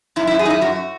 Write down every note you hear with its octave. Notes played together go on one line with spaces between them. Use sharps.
F#2 E4
F#2 E4
G#4
F#2 D#4 E4
F#2 F#4